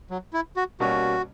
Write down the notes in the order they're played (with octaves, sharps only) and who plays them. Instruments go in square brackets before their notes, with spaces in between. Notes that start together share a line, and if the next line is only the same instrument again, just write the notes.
[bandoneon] F#3
E4
F#4
[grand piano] B2 G3 A#3 C#4 [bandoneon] F#4